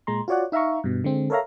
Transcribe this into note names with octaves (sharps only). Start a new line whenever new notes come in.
A#2 G#3 A#5 C6
F4 F#4 C#5 D5 F#5
D#4 E5 F5 A#5 C#6
G2 B2
D3 G#3 C4
A4 A#4 C#5 E5 F5 A#5